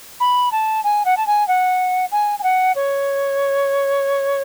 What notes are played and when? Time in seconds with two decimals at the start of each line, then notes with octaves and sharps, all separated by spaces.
0.20 B5
0.52 A5
0.84 G#5
1.05 F#5
1.17 A5
1.27 G#5
1.48 F#5
2.12 G#5
2.39 G#5
2.43 F#5
2.75 C#5